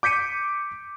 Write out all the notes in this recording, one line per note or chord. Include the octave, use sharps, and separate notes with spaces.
D6 G6 B6 C#7 D#7